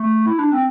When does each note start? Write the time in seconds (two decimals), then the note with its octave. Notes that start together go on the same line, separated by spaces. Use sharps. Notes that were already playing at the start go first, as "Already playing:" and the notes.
Already playing: A3
0.26 E4
0.39 D4
0.52 C4